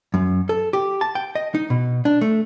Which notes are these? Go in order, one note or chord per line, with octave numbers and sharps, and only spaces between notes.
F#2
A4
G4
A5
G5
D#5
D#4
B2
D4
A3